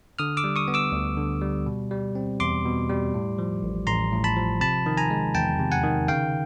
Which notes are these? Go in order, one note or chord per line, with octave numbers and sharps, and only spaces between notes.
D3 D#6 F6
D6 E6
G3
C#6 D#6
B3
D6 E6
D2
D3
G3
B2
G3
C4
E2 C6 D6
B2
G3
A2
F3
A1
A1 A#5 C6
A2
A5 B5
F3
C3 A5 B5
D#3
G#5 A#5
G#3
E2 G5 A5
C3
F#5 G#5
D#3
C#3 F5 G5